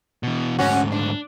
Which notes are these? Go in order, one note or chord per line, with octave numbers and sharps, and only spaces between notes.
B2 E3
D2 G#2 C#4 F#4
D4